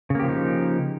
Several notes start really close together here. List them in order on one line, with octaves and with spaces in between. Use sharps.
C#3 A#3 G4 F3 D#4